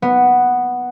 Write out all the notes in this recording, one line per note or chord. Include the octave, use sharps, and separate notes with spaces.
B3